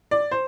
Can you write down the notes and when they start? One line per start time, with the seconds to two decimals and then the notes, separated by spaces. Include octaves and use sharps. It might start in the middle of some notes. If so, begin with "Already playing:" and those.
0.11 D5
0.32 C5